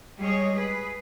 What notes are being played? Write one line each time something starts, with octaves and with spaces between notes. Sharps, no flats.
G3 G#3 G#4 C#5 D#5
G#4 B4